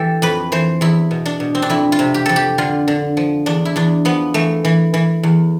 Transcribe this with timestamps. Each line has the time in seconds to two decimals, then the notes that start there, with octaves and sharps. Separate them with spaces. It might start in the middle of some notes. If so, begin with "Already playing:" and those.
Already playing: E3 G4 A4
0.22 F2 B4
0.52 E3 C5
0.81 E2 E4
1.11 B2
1.26 D4
1.40 B2
1.55 C4
1.62 D4
1.70 F2 E4
1.92 F4
1.99 C3
2.14 G4
2.26 F2 A4
2.36 G4
2.58 D3 F4
2.88 D3
3.17 F3
3.46 E2 D4
3.65 E4
3.76 E2 D4
4.05 F3 B3
4.34 E3 A3
4.65 E3
4.94 E3
5.23 E2